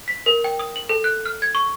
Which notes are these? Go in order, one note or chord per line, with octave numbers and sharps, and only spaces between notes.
B6
A#4
G5
D#6
F#7
A4
F#6
F6
G#6
C#6